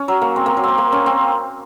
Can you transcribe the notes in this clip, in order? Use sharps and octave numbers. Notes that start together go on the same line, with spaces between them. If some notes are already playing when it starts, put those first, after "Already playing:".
Already playing: C#4
F#3
A#3
C4
A#3
F#3
A#3 C4
A#3
C#4
C4